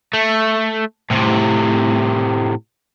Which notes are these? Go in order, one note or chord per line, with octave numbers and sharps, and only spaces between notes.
A3
A2 C3